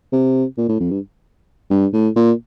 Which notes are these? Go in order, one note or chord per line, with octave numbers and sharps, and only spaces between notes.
C3
A#2
A2
F2
G2
G2
A2
A#2